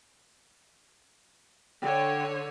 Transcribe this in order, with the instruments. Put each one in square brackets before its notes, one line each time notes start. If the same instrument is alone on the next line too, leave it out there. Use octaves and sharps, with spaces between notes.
[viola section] D3 C#5 [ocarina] G5